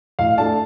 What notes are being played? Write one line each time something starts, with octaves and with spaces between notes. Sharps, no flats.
A2 F5
A3 D4 A5